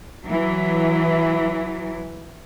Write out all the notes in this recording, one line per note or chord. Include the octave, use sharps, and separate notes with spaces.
E3 F#3